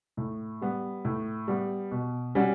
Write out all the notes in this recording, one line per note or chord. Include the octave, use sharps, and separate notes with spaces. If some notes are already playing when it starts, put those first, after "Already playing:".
A2
G3 B3
A2
G3 B3
B2
G3 C#4 F#4